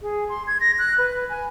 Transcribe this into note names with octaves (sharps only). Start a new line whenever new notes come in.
G#4
C6
G#6
A#6
F#6
B4
G#5